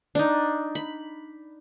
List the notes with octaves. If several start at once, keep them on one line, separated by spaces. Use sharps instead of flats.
D4 D#4
B5